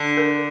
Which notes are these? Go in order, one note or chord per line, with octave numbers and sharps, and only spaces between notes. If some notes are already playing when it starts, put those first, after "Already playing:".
Already playing: D3
A#4